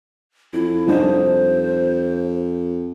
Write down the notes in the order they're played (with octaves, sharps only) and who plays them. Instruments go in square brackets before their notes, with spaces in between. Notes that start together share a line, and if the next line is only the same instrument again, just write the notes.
[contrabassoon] F2 [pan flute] E4
[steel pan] G3 D4 D#4 [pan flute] C5